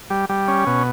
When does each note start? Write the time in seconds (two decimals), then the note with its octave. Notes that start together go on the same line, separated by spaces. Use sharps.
0.10 G3
0.29 G3
0.48 C#4
0.67 B2